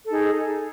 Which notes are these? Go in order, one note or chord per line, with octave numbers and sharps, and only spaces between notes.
D#4 G#4 A4